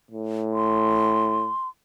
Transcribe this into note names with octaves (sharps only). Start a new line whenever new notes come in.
A2
C6